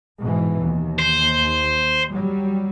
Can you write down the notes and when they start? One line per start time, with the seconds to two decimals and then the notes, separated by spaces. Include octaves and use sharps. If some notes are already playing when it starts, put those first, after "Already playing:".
0.20 G#2 B2 E3
0.64 D#2
0.99 C5
2.12 F#3 G3